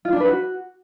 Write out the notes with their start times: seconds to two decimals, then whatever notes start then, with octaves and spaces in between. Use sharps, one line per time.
0.05 F4
0.13 D4
0.20 B4
0.28 F#4